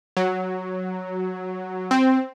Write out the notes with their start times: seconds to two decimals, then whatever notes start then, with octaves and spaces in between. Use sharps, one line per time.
0.17 F#3
1.91 C4